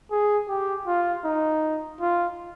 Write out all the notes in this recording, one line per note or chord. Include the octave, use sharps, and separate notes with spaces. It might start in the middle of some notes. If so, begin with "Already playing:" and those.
G#4
G4
F4
D#4
F4